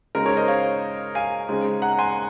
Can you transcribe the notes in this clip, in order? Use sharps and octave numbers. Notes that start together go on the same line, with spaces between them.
C#3 G#3 D#4 A#4
A#4 C#5
C5 D#5
C#5 F5
F5 G#5
C#3 G#3 C4 D#4
F#5 A#5
G#5 C6